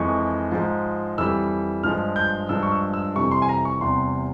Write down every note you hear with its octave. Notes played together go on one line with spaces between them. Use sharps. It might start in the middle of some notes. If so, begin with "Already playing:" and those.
Already playing: F2 E3 G#3 C#6
G#2 F3 G#3
F2 E3 G3 E6
G2 F3 G#3 F6
G6
G2 F3 G#3 E6
C#6
E6
E6
F2 C3 E3 G3 C#6
C6
G#5
A#5
C#6
E2 C3 G3 C6